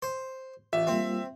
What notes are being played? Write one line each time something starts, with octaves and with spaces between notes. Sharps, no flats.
C5
A1 F4 E5
G3 A#3 C4 F4